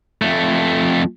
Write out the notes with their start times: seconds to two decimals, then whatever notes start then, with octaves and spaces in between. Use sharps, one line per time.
0.22 F2 A3